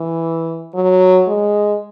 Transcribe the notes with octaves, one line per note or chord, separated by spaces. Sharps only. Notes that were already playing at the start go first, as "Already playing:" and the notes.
Already playing: E3
F#3
G#3